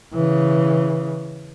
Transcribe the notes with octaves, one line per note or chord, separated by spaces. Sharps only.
C#3 E3